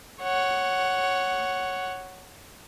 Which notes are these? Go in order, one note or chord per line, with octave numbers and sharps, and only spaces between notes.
C#5 F#5